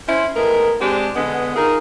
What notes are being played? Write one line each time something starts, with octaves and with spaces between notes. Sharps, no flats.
C#4 E4 C5
A2 G#3 B3 A#4
G#3 C4 D4 G4
D3 G#3 B3
D#4 F4 G#4 A#4